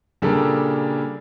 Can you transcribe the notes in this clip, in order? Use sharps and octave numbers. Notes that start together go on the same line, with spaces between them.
A#2 C#3 G3 D4 A4 A#4